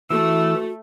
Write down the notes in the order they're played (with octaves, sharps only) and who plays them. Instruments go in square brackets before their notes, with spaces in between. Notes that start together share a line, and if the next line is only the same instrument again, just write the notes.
[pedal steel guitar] E3 [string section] A3 [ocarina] F#4 [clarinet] E6